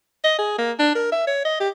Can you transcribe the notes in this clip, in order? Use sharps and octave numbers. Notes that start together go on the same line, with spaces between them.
D#5
G#4
A#3
D4
A#4
E5
C#5
D#5
G4